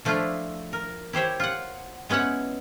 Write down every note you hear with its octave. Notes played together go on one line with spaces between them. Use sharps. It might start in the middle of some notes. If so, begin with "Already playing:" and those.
F3 A3 D4 E4 F4
A#4
E4 G4 C5 C#5
F4 F#5
G#3 B3 C#4 E4 F#5